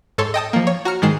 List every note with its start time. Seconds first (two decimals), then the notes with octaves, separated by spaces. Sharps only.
0.18 G#2 A4 C#5 C6
0.34 D#5 G5 A5 D#6
0.53 F3 A#3
0.67 C#5
0.85 F#4 A#5 F6 C#7
1.02 G#2 D#3 G#3 C7 E7